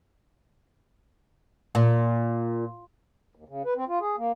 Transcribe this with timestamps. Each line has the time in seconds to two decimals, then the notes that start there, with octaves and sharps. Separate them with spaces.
1.75 A#2
3.35 D#2
3.48 C#3
3.65 B4
3.76 C4
3.88 F4
4.00 G#4
4.18 A#3